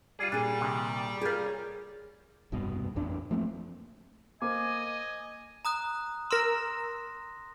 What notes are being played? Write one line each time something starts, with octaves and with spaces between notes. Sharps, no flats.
G3 F4 G#4
A#2 D4 G#4
C3 D#3
F4 G4 G#4 A#4
C#5
F1 C2 G2 B2
A1 F2 D4
F3 A3 A#3 C4
A#3 C5 D#5 G#5 D6
A#5 D#6 F#6
A#4 C6 E6 A#6